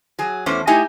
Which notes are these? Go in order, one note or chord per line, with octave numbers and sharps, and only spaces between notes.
F#3 G#4
E2 A3 C#4 C5
A3 D#4 E4 G4 D#5 G#5